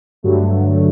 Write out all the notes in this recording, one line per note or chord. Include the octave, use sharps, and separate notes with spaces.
G2 D3 F#3 A3